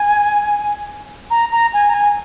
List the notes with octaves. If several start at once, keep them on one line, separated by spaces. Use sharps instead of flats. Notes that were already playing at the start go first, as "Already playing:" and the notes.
Already playing: G#5
A#5
A#5
G#5
A#5
G#5